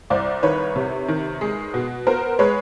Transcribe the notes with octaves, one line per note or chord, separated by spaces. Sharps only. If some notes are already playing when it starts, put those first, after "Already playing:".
C2 C5 D5
D#3 B4 C#5
C3
D#3
G#3
B2
B3 A#4 C5
G#3 B4 C#5